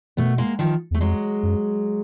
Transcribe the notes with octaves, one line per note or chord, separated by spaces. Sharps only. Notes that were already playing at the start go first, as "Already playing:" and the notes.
B2 A3 B3
G#3 A#3
D#3 F3
E2 A3
F2 F#3 G#3
F#2